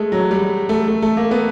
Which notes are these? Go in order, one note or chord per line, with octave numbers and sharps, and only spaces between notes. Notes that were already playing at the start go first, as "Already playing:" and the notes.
Already playing: G#3 A3
F#3
G3
A3
A3
A3
A#3
B3